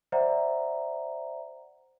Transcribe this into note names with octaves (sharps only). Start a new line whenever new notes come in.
C5 D5 E5 F#5 A#5